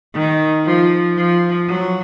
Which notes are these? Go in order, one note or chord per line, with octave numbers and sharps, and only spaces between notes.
D#3
F3
F3
F#3